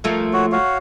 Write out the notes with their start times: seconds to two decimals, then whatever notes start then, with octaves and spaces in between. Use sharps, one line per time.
0.04 F3 A3 A#3
0.33 F#4 C#5
0.52 F#4 C#5 F5